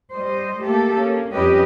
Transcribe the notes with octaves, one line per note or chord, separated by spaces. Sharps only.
G3 C5 D#5
A3 A#3 G4 A4
A#3 C#4
F2 G3 C#4 G4 B4 D#5